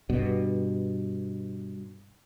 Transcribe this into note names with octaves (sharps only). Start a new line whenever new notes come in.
G2 B2